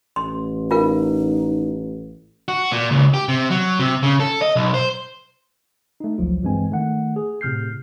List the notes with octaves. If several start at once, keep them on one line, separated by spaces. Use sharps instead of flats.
A1 C6
D#4 F4 A#4 F5
F#4
A#2
C#2
G4
C3
F#3
C3
C#3
A4
D#5
B1
C5
A3 D#4
G1 C#2 F3 F#3 F4
G2 E3 G#3 C4 G#5
D#3 A3 F#5
G#4
A2 C3 F6 G6 C7